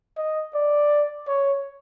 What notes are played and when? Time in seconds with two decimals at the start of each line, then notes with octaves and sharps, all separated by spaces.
0.18 D#5
0.54 D5
1.28 C#5